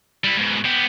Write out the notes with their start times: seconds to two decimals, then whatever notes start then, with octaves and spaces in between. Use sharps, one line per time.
0.24 G3 E4
0.37 G#2 B2
0.66 B3 G4